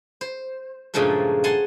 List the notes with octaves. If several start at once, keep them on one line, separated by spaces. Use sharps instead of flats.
C5
G2 A#2 C#3 F3 G#3 A3
F#5 G#5 A5 C6